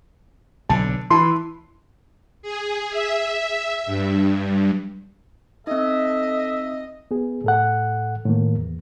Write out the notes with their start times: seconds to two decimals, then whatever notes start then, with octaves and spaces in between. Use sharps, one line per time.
0.69 B1 D3 A5
1.10 E3 E4 A5 C6
2.42 G#4
2.91 E5
3.86 G2
5.67 C4 D#4 A4 D#5 E5
7.11 B3 G#4
7.44 A2 A4 F#5
8.26 A2 D#3 A#3
8.57 E2